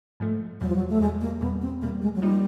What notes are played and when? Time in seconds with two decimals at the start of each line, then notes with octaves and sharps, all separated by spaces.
0.20 G#2 F3 A3
0.61 E2 B2 F#3 G3
0.68 F3
0.76 F#3
0.89 A3
1.01 E2 B2 G3 G#3
1.21 A#3
1.41 E2 B2 G3 B3
1.62 C4
1.81 E2 B2 G3 A#3
2.02 G#3
2.15 F#3
2.22 F3 G3 A#3 D#4